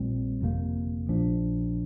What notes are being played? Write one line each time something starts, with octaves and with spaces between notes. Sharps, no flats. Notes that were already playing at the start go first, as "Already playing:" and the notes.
Already playing: A#1 A#2 G3 C4
G1 F2 C3 A#3
A#1 A#2 F3 D4